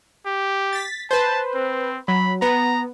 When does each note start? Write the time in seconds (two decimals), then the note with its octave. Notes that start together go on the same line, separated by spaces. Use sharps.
0.26 G4
0.73 A6 B6
1.11 B4 C5 A5
1.56 C4
2.08 F#3 B5
2.42 B3 A#5